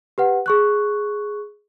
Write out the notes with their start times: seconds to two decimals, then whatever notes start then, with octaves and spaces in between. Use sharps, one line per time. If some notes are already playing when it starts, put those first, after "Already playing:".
0.18 G4 B4 F#5
0.46 G#4 C#6 F#6